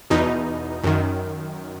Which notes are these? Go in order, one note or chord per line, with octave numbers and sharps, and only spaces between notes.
E2 B2 D#4
F#2 D#3